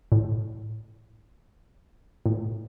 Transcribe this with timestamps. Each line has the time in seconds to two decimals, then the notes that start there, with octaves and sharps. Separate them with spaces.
0.12 A2
2.26 A2